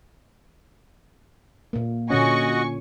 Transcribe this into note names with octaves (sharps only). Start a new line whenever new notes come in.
A#2 A#3
A#2 D3 C#4 F#4 D#5 F#5 G#5 C#6